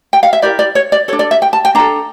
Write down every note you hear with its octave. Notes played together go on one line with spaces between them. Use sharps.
G5
F5
E5
E4 G4 A#4 D5
D5
C#5
D5
D4 A4 C#5
D5
E5
G5
A5
G5
D4 A4 A#5